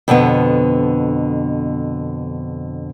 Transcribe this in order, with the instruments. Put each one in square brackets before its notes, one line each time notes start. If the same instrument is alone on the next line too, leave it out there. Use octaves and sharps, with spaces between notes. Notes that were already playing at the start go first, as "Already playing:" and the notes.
[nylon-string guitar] F2 B2 D3 B3